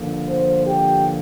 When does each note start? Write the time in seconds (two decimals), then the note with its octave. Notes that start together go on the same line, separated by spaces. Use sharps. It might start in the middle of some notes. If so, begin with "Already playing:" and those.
Already playing: G2 D3 F3 A#3
0.28 C5
0.67 G4